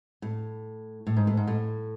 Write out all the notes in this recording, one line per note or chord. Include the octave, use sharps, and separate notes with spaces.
A2
A2
G#2
A2
G#2
A2